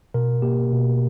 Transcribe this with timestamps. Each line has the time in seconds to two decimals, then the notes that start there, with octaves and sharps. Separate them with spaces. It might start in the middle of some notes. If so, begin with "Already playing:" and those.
0.14 B2 A#4
0.42 A#3 G4
0.72 B2